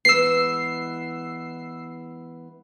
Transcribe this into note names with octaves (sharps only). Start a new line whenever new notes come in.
E3 G#3 B3 E6 C7